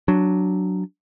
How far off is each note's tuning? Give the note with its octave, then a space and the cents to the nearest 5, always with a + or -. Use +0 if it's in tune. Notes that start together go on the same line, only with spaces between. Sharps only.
F#3 +0 D4 +0